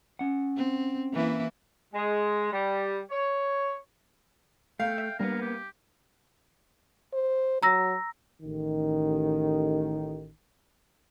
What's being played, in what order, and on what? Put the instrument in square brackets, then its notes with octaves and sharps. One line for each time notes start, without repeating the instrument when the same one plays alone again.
[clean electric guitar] C#4 F#5
[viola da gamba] C4
E3 A#3 E4
[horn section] G#3
G3
C#5
[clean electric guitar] A3 [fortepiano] F5 [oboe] G5
[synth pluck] E5
[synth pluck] G3 D4 [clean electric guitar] A#3 B3 [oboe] A#4
[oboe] G4
[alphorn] C5
[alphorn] F#3 [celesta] A#5 E6 A#6
[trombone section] A1 D#3